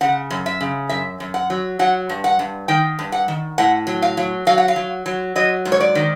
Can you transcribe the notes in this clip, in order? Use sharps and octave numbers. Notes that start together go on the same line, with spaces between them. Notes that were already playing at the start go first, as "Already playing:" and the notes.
C#3 F#5
F#2
E5
C#3
F#2 E5
F#2
F#5
F#3
F#3 F#5
G2
F#5
G2
D#3 G5
G2
F#5
D#3
A2 F#5
F#3
F5
F#3
F#3 F5
F#5
F5
F#3
F#3
F#3 D#5
G#2
C#5
D5
D#3